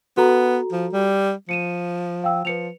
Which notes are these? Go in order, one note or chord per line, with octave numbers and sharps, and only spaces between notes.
B3 F#4 A4 A#5
F3
G3
F3 C#7 D#7 E7
F5 G5 E6
F3 B4 C#7 F7